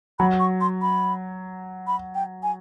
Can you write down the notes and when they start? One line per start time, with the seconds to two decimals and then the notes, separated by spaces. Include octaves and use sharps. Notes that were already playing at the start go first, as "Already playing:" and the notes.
0.19 F#3 B5
0.40 C#6
0.61 C6
0.82 B5
1.87 B5
2.15 G5
2.43 G#5